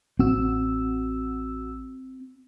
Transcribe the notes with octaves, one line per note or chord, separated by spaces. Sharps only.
A1 C4 F#4 E6